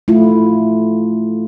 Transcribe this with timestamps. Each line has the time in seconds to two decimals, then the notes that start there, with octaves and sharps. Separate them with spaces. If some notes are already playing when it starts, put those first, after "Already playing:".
0.08 A3 E4 F4